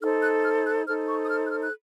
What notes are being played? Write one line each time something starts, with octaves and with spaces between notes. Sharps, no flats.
D#4 A4 C5 F6
F#6
F6
F#6
D#4 A4 C5 F6
C#6
D#6
F6
F#6
F6
F#6